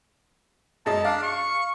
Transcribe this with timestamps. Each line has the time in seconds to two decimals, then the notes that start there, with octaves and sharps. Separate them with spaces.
0.86 F#2 G#3 D#5 A5
1.05 D4 F5
1.23 C#6